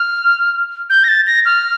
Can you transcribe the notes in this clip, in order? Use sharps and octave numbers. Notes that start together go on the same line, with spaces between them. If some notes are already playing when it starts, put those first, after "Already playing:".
Already playing: F6
G6
A#6
A6
A#6
F6